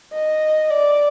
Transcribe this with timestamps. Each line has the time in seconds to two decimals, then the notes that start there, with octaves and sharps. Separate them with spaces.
0.13 D#5
0.70 D5